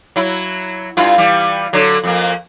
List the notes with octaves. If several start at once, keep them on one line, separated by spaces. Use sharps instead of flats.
F#3 E4
G2 E4 F4
E3 G3
D3 F#3
F2 A#3